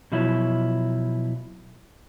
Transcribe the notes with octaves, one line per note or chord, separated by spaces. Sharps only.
B2 F3 F#3 E4